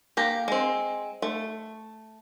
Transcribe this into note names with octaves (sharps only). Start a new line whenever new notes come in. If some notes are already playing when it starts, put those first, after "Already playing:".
A#3 G4 A#5
G#3 C4
A3